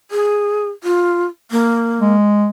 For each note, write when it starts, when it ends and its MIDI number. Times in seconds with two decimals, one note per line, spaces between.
0.11 0.70 68
0.84 1.25 65
1.51 2.13 58
2.01 2.49 56